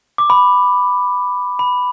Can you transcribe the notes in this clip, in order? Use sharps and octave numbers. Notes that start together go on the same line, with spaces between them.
D6
B5
B5